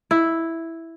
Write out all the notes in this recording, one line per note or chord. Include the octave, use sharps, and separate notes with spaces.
E4